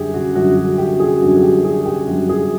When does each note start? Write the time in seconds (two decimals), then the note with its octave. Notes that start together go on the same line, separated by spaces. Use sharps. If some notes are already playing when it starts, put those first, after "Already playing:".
Already playing: F#2 D3 G3 G4 G#4
0.14 F#4
0.35 F#2 D3 G3 F#4
0.57 F#4
0.78 G4
1.00 G#4
1.21 F#2 D3 G3 F#4
1.36 G#4
1.43 G4
1.64 G#4
1.85 G4
2.07 F#2 D3 G3 F#4
2.29 G#4